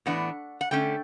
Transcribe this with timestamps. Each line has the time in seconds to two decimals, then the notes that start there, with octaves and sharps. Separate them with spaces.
0.06 A2 E3 B3 D4 F#5
0.61 F#5
0.71 D3 A3 C#4 G5